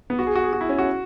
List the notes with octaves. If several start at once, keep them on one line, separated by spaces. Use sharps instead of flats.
B3
F#4
G#4
F#4
G#4
F#4
E4
C#4
F#4